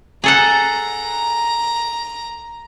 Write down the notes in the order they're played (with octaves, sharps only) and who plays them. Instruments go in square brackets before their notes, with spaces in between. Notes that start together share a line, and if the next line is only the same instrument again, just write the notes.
[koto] G#4 A4 F#5 [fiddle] A#5